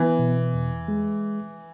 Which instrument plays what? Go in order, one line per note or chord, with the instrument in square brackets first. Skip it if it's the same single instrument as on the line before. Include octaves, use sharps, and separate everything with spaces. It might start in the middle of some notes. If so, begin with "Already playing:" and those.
Already playing: [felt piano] E3 [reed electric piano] B3
[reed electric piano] B2
E2
G#3